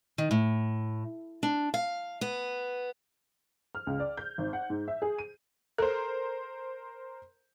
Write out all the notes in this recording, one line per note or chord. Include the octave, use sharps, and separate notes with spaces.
D#3
A2
D4
F5
B3
F6
C#2
D5
G6
G#1
F#5
G#2
E5
G#4
D#7
A4 A#4 C5